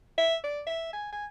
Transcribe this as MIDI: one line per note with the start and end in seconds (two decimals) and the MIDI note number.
0.18 0.35 76
0.44 0.61 74
0.67 0.89 76
0.93 1.10 80
1.12 1.26 80